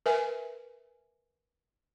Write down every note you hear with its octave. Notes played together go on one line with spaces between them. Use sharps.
A#4 B4 E5 G#5